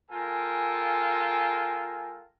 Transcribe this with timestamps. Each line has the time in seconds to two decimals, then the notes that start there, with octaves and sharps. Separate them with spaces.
0.11 G#3 F4 A4 A#4 G5 G#5